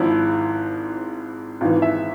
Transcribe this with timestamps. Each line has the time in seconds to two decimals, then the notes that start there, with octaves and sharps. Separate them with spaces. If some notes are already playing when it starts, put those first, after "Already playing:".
Already playing: G#1 G#2 F3 E4
1.61 G#1 G#2 E3 F4
1.82 E5